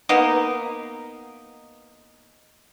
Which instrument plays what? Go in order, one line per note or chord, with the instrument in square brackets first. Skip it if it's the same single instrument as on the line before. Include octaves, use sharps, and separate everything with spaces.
[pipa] A#3 B3 D#4